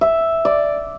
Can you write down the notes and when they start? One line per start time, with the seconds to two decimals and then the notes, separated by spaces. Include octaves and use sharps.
0.01 E5
0.45 D5